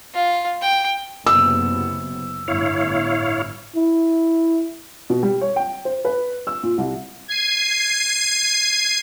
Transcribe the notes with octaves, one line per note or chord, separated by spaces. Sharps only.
F4
G5
F#1 C3 B3 E6
G1 A2 E4 C#5 F5
E4
B2
G3
C#5
G5
C5
B4
E6
A#2
C2
G#6 C7 D#7